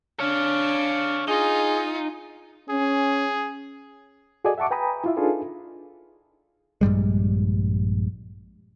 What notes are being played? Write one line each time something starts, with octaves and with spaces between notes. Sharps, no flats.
D4 C#5 F5
D#4 F4 G#4
C#4 G#4
F#4 G#4 A4 D5 D#5 G#5
E5 F#5 A5 C#6 D6
B4 G5 G#5 A#5 B5 D#6
E4 F4 E5
D4 D#4 F4 G#4 A4 B4
A#1 G2 G3 G#3